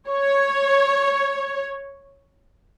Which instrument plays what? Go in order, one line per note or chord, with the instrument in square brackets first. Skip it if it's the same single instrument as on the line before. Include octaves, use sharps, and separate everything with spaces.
[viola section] C#5